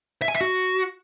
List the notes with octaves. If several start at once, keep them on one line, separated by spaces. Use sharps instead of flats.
E5
G#5
E5
F#4